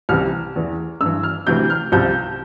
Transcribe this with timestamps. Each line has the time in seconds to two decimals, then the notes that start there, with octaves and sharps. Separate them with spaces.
0.09 C2 C3 E3 F6
0.56 E2 E3
1.01 G2 E6
1.06 E3
1.23 F6
1.47 D2 C3 E3 G6
1.70 F6
1.92 C2 C3 F3 G6